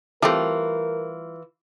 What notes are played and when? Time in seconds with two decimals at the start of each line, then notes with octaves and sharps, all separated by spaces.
0.22 E3 G3 A3 C4 F4 A#4